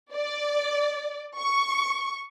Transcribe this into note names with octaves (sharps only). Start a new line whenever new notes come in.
D5
C#6